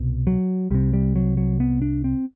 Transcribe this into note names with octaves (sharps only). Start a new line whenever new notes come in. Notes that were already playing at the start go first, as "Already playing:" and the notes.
Already playing: C2 B2
F#3
C2 C3 G3
G3
F#3
F#3
B3
D4
C4